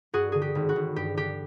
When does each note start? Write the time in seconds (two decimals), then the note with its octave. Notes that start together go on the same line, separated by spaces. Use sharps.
0.13 G2 F#4 G#4
0.32 D3 G#4
0.42 G4
0.55 G#1
0.69 F#4
0.76 G#1
0.96 G2 G4
1.17 D3 G4